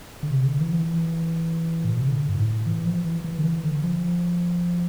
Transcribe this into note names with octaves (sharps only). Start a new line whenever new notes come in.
D3
C3
D3
E3
F3
E3
A2
A#2
C3
D3
G2
A2
E3
F3
E3
E3
D3
E3
D3
F3